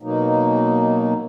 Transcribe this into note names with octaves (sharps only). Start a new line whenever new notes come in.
B2 F#3 A#3 D#4